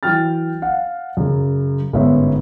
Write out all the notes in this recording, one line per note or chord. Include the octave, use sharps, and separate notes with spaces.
E3 F#3 G5 F6 A6
F5 F#5
F#2 C#3
G1 G#2 B3 C#4 E5